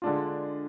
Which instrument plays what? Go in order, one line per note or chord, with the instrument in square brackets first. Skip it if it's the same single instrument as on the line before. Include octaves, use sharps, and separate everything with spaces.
[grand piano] D3 G#3 D4 F4